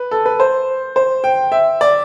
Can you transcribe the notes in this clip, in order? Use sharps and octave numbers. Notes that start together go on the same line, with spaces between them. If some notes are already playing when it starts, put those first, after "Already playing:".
Already playing: B4
A4
B4
C5
C5
G5
E5
D5